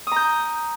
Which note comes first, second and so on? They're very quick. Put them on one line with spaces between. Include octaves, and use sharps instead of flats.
D#6 A#5 G6